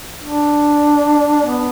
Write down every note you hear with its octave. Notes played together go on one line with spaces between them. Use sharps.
D4
B3